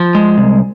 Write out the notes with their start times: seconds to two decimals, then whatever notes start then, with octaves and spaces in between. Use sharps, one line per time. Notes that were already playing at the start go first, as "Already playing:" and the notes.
Already playing: F3
0.15 G#3
0.38 C2